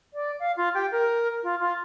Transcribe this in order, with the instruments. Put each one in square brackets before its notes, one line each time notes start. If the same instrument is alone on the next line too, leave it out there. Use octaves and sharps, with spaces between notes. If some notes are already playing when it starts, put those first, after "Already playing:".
[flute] D5
F5
F4
G4
A#4
F4
F4